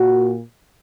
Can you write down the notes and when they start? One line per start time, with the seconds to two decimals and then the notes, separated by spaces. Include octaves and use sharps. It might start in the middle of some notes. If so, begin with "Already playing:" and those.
Already playing: A#2 F#4